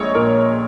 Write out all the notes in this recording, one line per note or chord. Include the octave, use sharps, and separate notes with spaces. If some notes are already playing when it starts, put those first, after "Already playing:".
Already playing: A#1 G#3 C#5 D#5
A#2 A#4